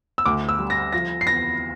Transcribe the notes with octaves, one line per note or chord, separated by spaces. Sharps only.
E6
D2 D6
E6
G3
A#6
F3 A#6
C7
E2 A#6